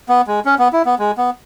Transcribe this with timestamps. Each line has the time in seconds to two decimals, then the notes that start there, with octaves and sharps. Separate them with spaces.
0.09 B3
0.27 G#3
0.45 C#4
0.59 B3
0.73 E4
0.85 B3
0.99 G#3
1.18 B3